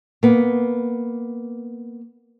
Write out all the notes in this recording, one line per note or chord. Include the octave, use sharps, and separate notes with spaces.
A#3 B3